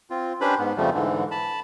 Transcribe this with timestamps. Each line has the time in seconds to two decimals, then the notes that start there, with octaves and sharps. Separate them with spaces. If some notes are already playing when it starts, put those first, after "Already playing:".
0.10 C4 F4
0.41 C#4 D4 G4 B4 C5 B5
0.59 G#2 B3
0.77 F2 C#3 F3 G3 A3
0.94 G#2 D3 E3
1.31 A5 B5